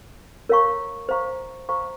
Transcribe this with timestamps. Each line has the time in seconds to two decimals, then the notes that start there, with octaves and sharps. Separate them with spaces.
0.49 A#4 C#5 F5 A#5 C#6
1.09 C5 F5 A#5 C#6
1.69 C5 F5 A#5 C#6